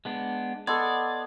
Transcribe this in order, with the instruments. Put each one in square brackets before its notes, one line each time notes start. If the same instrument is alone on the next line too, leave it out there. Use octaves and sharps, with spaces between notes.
[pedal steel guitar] G#3 B3 D4
[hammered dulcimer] B3 A4 [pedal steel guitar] D5 [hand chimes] D#5 C6 G#6